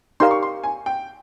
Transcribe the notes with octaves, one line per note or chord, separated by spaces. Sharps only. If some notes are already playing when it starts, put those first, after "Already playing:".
D#4 G4 A#4 D5 F5 C6
C#6
C6
G#5
G5